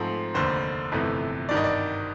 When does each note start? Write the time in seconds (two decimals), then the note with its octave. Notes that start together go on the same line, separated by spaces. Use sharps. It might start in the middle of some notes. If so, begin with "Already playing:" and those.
Already playing: G#2 F3 A3 C4
0.35 F1 D#2 D3 C5
0.92 G1 F2 C3 E3 A3
1.49 G#1 G2 D#3 D5
1.57 D#5
1.64 D5